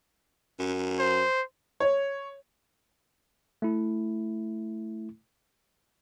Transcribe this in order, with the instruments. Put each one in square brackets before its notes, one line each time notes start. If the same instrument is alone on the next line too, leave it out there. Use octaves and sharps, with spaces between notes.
[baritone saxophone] F#2
[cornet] C5
[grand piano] C#5
[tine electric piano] A3 E4